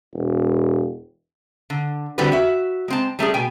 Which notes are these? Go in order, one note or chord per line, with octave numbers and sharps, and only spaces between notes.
E1
D3
D3 E3 G3 C4 F#4 B4
F#4 E5
G#3 C4 A5
G3 A3 C#4 G#4
B2 G5 G#5